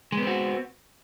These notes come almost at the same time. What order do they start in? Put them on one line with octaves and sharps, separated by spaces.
G#3 B3 C4 F#4